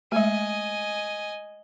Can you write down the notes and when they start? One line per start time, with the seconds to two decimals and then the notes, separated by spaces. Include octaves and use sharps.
0.12 G#3 A3 D#5 G#5